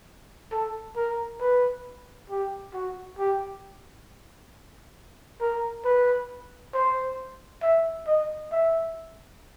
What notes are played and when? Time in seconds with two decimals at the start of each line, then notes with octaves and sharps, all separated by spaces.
0.52 A4
0.96 A#4
1.41 B4
2.30 G4
2.74 F#4
3.19 G4
5.41 A#4
5.85 B4
6.74 C5
7.62 E5
8.07 D#5
8.52 E5